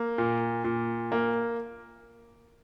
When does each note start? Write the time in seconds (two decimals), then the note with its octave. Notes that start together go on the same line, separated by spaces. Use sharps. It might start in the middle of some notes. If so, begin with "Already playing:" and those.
Already playing: A#3
0.18 A#2
0.64 A#2
1.12 A#3